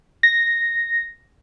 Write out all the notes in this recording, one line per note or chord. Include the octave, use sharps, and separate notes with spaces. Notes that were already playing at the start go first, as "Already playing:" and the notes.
A#6